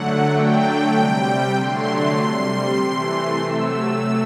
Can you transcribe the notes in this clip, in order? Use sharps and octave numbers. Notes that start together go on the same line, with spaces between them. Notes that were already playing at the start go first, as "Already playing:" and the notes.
Already playing: D3 F#3 A3 F#5
D3 F#3 A3 G5
C3 G3
D3 F#3 A3 C6
C3 G3
C3 E3 A3
C3 F#3 A3 E6